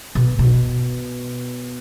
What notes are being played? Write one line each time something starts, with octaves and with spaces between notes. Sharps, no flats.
B2
B2